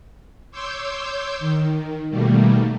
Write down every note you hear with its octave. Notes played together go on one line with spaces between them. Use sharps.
C#5 C6 D6 E6 G6
D#3
B2 D#3 G3 A3 A#3